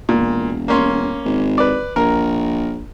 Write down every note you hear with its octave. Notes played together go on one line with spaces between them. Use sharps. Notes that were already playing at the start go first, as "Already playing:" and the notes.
E1 A#2
A#3 C#4 C6
G#1
B4 D5
A#1 A#4